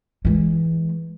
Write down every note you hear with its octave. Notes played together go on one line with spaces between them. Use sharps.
E3 G#3